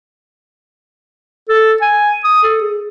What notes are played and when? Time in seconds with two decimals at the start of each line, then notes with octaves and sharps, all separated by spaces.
1.49 A4
1.81 G#5
2.24 D#6
2.43 A4
2.61 G#4